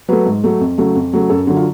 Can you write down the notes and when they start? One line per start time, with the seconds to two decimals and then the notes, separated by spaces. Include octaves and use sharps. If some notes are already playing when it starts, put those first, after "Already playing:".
0.09 F#3 A3 B4
0.26 G#2
0.44 F#3 A3
0.60 F2
0.78 C#3 F#3 A3
0.95 F2
1.13 C#3 F#3 A3
1.30 F#2 A4
1.47 D3 F#3
1.56 F4